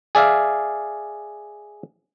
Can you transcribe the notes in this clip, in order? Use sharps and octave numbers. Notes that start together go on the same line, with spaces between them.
G#4 D5 E5 F5